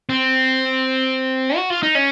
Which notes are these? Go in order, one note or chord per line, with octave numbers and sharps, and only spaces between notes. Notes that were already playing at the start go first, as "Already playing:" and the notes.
C4
F#4
F4
D#4
C#4